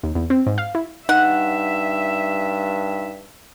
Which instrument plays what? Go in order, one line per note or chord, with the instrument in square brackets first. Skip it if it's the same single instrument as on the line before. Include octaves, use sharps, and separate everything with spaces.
[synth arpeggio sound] D#2
E2
C4
G#2
F5
E4
[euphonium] G2 [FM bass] D#4 [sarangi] E5 [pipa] F#5